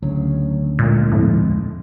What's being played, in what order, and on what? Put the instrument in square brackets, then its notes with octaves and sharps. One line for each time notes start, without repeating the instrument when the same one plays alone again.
[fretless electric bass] D2 C#3 [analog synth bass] F#3
[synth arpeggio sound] A#2 [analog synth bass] G#3
[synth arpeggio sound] F2 A2